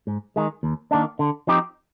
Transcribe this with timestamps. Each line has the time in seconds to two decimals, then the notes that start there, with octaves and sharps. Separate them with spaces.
0.07 G#2
0.36 D#3 G#3
0.63 D#2
0.91 D#3 A#3 D4
1.19 D3
1.47 F3 C4 D#4 G4